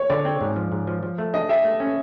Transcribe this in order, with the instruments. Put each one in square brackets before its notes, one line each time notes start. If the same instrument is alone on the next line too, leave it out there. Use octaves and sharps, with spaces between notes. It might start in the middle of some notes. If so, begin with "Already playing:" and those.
Already playing: [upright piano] C#5
[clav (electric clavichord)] D3 [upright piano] D5
[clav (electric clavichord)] C4
G#2
F3
G#2
F3
F3
A3
[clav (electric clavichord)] D4 [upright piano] D#5
[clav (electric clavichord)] G4 [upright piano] E5
[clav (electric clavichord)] A3
C#4